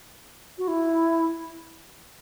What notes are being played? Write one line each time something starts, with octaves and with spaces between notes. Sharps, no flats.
F#4
E4